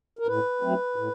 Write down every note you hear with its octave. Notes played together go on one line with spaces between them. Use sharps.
A#4
A2 B4
F#3 A3 C4
A2